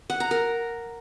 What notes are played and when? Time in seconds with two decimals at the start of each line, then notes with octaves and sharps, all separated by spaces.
0.10 F#5
0.20 A#5
0.31 A#4